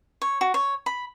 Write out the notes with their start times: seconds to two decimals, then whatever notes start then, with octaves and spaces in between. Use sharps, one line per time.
0.22 C#5
0.41 F#4
0.54 C#5
0.86 B5